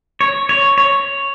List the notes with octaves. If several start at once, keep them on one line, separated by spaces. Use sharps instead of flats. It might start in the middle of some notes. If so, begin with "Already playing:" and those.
C#5
C#5
C#5